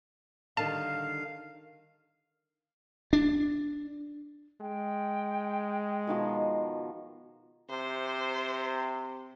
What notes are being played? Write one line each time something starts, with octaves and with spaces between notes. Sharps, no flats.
D3 D#3 G3 F5 A5
D4
G#3 G5
B2 D#3 F3
C3 C5